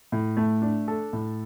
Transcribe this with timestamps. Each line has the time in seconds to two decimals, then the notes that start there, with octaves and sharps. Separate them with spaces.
0.12 A2
0.37 A3
0.62 D4
0.88 A4
1.13 A2